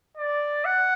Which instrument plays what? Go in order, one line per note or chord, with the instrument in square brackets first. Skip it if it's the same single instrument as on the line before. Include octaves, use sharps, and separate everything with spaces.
[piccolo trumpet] D5
F#5